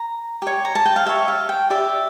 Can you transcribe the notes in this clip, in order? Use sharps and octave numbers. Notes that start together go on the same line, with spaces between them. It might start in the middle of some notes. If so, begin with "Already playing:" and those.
Already playing: A#5
G4 C#5
A#5
A5
G5
F5
G4 C#5 E5
F5
G5
G4 D5 E5